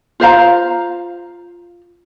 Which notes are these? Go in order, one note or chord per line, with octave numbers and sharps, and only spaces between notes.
F4 C5 F5 A#5